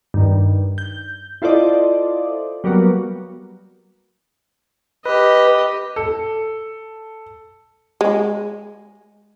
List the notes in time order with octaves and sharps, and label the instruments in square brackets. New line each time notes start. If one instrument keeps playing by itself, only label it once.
[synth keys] G2 D#3
G6
E4 F4 A4 C5 D5 D#5
F#3 G3 A#3 B3 F#4
[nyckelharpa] G4 D#5 [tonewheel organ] B4
[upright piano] A4
[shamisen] G#3